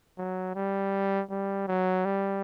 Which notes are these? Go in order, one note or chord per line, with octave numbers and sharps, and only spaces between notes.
F#3
G3
G3
F#3
G3